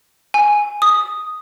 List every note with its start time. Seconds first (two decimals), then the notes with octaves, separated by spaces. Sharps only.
0.34 G#5
0.82 D#6